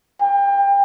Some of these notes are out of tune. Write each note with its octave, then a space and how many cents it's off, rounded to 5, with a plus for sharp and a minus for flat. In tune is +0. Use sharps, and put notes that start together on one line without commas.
G5 +30